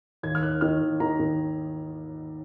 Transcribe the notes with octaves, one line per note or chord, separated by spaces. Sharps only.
D#2 G#6
F6
D#2 F#6
D#3 F6
D#2
D#3 A#5
D#3